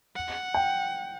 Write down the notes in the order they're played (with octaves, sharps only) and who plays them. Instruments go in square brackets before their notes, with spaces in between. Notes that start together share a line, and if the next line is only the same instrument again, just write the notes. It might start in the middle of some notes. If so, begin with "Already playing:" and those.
[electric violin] F#5
[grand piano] G5